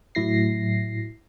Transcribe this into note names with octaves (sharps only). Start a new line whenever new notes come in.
A2 F#3 E4 A#6 C7